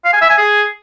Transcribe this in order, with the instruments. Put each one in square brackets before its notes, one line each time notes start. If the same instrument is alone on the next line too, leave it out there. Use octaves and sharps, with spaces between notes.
[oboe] F5
G#5
E5
G#5
G#4